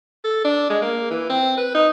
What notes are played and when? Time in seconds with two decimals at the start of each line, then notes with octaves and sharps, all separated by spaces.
0.24 A4
0.45 D4
0.70 G#3
0.82 A#3
1.11 E3
1.30 C4
1.57 B4
1.75 D#4